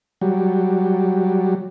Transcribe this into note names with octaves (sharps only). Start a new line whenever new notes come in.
F#3 G3